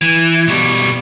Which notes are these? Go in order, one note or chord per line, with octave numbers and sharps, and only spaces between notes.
E3
B2 G3